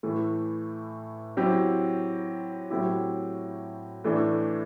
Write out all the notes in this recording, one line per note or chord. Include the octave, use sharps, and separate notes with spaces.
A2 E3 A3
F#3 C4 E4 G4
A2 F#3 C4 E4 G4
A2 E3 A3 D4